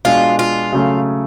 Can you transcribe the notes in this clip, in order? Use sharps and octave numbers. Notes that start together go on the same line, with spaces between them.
B2 G#3 D4 F4
F4
C#3 F#3 A3 C#4